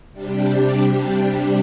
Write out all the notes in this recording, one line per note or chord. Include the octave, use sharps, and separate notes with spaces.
C3 G3 D4 G4